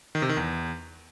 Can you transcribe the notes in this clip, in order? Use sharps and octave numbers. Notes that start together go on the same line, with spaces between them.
D#3
C3
D#3
E2